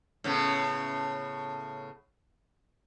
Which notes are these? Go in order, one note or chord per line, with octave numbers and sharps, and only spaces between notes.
A2 C#3 B3